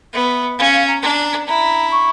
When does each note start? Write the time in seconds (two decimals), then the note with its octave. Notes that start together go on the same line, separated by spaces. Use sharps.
0.13 B3 E5
0.58 C#4 F5
0.72 F5
0.87 A#5
1.02 D4 A#5
1.47 E4 A#5
1.91 C#6